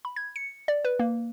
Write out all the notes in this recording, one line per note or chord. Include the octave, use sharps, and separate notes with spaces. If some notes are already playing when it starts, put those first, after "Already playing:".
B5
G#6
C#7
D5
B4
A#3